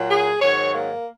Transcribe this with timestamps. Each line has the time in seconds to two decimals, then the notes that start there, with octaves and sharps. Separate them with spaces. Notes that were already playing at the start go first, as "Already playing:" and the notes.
Already playing: A#2 F#3
0.10 G#4
0.40 G#2 D#3 F#3 C#5
0.72 A#3